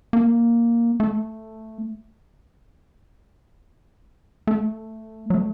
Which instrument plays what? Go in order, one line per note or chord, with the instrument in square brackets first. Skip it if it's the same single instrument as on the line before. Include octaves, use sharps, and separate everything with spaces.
[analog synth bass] A#3
A3
A3
F#3
A3